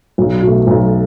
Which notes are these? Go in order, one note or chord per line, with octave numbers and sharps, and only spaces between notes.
B1
B2 A3
B1